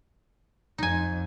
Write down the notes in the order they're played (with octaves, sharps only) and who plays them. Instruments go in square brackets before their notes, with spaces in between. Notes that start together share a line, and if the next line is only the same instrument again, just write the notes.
[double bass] F2 [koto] D#4 G#5